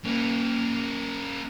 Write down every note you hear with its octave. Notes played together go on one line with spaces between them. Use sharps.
A#3 C#4